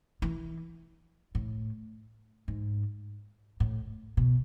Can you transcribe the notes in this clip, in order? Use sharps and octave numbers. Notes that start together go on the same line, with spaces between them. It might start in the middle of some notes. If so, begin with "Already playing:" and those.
E3
A2
G#2
A2
B2